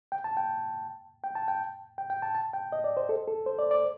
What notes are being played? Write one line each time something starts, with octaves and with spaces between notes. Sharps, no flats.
G5
A5
G5
G5
A5
G5
G5
G5
A5
A5
G5
D#5
D5
C5
A4
A4
C5
D5
D5